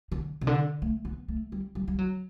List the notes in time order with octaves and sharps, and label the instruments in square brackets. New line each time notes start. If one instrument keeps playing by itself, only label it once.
[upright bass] D3
C3
D3
A3
B3
A3
G3
G3
G3
F#3